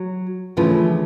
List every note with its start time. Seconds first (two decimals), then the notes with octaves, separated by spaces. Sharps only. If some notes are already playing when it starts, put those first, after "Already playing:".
Already playing: F#3
0.57 D2 C#3 E3 F3